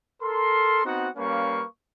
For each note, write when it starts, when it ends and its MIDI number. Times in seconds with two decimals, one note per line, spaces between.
0.22 0.83 69
0.22 0.83 70
0.22 0.83 84
0.85 1.09 59
0.85 1.09 60
0.85 1.09 63
0.85 1.09 66
0.85 1.09 78
1.17 1.64 55
1.17 1.64 58
1.17 1.64 61
1.17 1.64 71
1.17 1.64 77
1.17 1.64 85